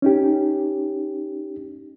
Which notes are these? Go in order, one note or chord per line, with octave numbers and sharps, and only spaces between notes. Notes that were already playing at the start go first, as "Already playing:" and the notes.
C#4 D#4 G4